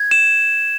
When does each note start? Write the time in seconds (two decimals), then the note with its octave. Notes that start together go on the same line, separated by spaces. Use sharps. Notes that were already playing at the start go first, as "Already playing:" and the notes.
Already playing: G#6
0.11 E7